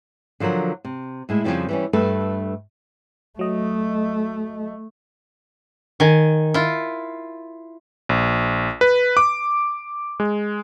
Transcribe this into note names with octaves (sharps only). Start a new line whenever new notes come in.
D3 F3 F#3 A#4 F#5
C3
A2 G#3 E4
F2 A#2 C#3 F3 G3
E3 G3 C#4
G2 A3 A4 B4
F#3 A3 D#5
D#3 G#5
E4 F4
A#1
B4
D6
G#3